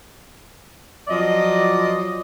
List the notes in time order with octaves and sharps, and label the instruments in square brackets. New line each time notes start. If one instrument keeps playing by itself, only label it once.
[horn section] F3 F#3 D5 D#5